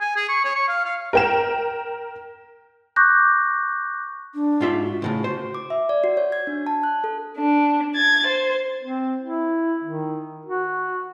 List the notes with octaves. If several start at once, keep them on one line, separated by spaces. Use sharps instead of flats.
G#5
G#4
C#6
C#5
C#6
F5
F5
A#4 G5 E7
C#6 D6 F#6 G6 A#6
D4
G#2 F4 E5
F#4
C#2 A2 C#3
C5
D6
E5
D5
F#4
C#5
G#6
D4
A5
F#6
A4
D4
G#6 A6
C5
C4
E4
D#3
F#4